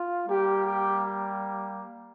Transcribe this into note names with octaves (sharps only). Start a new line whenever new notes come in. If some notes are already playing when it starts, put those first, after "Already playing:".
Already playing: F4
G3 A#3 G4
G4